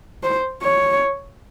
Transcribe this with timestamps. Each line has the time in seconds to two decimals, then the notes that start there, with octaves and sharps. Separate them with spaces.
0.23 C5
0.62 C#5